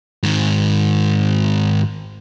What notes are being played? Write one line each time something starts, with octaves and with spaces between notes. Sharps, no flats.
G#2 D#3